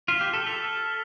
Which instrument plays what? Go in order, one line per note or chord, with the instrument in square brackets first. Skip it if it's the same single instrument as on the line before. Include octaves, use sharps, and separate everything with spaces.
[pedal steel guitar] F4 [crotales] F6 B6 E7 G7
[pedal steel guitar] G4
A4
[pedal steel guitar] A4 [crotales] E6 B6 F7